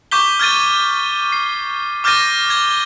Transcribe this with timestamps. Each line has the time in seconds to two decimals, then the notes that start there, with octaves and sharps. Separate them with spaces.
0.11 C#6 D6 G6 B6 G7
0.39 F6 G#6 A6 D#7
1.32 C7
2.04 D6 F6 G6 A6 A#6 D#7
2.50 G#6 G7